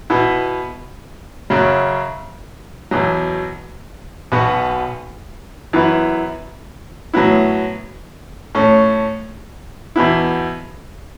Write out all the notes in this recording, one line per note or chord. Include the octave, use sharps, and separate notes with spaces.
B2 B3 E4
F#2 C#3 F#3
E2 B2 F#3
B1 B2 B3 F#4
F#2 E3 B3 E4
A2 F#3 B3 E4
A2 A3 C#4
E2 B2 B3 E4